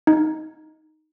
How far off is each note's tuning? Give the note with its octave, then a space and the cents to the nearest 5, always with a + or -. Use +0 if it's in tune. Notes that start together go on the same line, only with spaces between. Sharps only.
D#4 +0